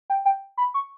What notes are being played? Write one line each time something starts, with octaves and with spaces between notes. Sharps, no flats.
G5
G5
B5
C#6